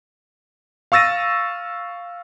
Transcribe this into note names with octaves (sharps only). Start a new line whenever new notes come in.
F5 C#6 E6 A6 A#6 D#7